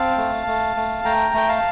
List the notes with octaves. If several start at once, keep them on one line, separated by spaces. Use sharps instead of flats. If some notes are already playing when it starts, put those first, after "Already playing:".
Already playing: C4 F5 A5
A3
A3
A3
A3 G5 A#5
A3 G5
F5 A5